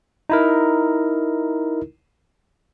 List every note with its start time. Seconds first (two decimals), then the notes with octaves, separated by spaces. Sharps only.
0.29 D#4 E4 A#4